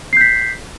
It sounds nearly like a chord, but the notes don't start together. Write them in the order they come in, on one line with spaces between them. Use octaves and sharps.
C7 G6 B6